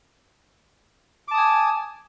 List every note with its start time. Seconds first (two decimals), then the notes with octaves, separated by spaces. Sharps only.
1.28 D6
1.31 A5
1.34 D#6
1.37 G#5